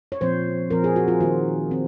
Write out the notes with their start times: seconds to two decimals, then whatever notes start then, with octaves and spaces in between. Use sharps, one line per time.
0.12 C#5
0.21 A#2 F3 C4 C5
0.70 A#2 F3 C4 A#4
0.84 G#4
0.96 F#4
1.08 F4
1.20 D#3 A#3 F4
1.71 D#3 C4